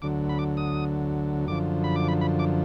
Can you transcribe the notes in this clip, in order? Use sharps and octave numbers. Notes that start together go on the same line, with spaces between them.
D2 D3 F#3 D6
B5
D6
D#6
F#2 D3 F3 D6
B5
D6
B5
B5
D6